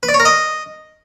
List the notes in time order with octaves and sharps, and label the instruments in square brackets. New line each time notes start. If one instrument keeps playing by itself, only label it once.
[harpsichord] B4
D5
C#5
A#4
D#5